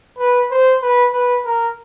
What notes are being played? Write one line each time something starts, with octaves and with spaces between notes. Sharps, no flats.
B4
C5
B4
B4
A#4